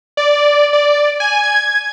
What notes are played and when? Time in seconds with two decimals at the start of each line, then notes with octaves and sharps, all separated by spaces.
0.17 D5
0.73 D5
1.20 G#5
1.43 G#6